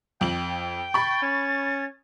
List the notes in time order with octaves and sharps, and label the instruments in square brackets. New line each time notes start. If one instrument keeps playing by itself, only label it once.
[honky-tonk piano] F2 F#7 [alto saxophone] G5
[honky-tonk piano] B5 C#6 [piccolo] A6
[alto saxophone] C#4